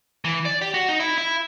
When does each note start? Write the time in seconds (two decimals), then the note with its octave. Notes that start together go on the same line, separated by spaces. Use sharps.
0.25 E3
0.45 D5
0.62 G4
0.74 F#4
0.88 D#4
1.00 E4
1.18 E4